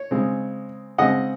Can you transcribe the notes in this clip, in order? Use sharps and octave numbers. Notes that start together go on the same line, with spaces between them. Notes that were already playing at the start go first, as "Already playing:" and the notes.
Already playing: C#5
C#3 G#3 C4
C#3 G#3 C4 D#5 F#5